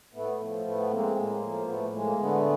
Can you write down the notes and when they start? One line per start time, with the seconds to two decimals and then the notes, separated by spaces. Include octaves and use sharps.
0.14 A2 A3 B3
0.40 F3
0.65 A2 A3 B3
0.91 G#3 A#3 C4
1.17 A2 A#3
1.42 F3
1.67 A2 A3 B3
1.93 G#3
2.01 A#3
2.19 D3 A3 B3